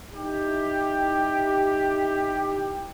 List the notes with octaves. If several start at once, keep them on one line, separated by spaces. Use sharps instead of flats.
D#4 E4 G4